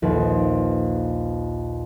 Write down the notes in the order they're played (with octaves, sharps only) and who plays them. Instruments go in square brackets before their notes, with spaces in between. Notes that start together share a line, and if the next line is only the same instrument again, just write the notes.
[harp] A#1 D#2 B4